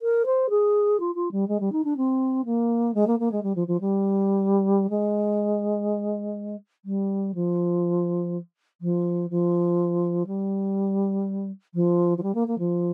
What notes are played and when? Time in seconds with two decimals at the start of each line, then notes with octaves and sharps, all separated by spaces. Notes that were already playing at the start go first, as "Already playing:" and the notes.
0.02 A#4
0.26 C5
0.50 G#4
1.00 F4
1.15 F4
1.32 G3
1.48 G#3
1.60 G3
1.72 D#4
1.84 D4
1.97 C4
2.45 A#3
2.94 G#3
3.07 A#3
3.20 A#3
3.32 G#3
3.43 G3
3.56 F3
3.68 F3
3.81 G3
4.90 G#3
6.85 G3
7.35 F3
8.81 F3
9.30 F3
10.27 G3
11.74 F3
12.18 F3
12.23 G3
12.35 A#3
12.48 A#3
12.59 F3